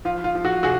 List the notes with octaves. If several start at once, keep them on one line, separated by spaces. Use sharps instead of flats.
F3 F4
F4
F3
F#4
C3 F#4 G#4